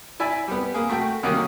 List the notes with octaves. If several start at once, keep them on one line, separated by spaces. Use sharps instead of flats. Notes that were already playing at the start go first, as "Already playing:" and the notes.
E4 D5 E5 G#5
G3 B3
A#3 G#4
A3 F#4 G5
D3 D#3 F#3 G3 A#3 C#4